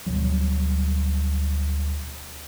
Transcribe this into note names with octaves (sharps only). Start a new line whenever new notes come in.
D2 B2 F#3 G3